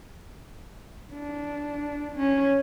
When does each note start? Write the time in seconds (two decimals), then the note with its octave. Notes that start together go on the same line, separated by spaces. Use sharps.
1.13 D4
2.16 C#4